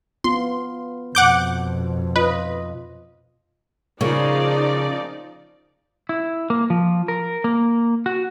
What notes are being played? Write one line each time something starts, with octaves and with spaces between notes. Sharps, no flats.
B3 F4 C6
F2 B2 F#5 D6 G6
F4 B4 D#5
C#3 F3 A#3 D#4 F4 D5
E4
A#3
F3
A#4
A#3
F#4